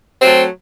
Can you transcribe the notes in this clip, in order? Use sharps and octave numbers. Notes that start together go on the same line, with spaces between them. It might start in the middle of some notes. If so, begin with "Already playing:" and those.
F#3 A3 C4